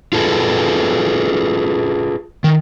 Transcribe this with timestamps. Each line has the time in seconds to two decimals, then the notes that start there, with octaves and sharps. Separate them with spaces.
0.13 F4 G#4 A4 B4
2.44 D#3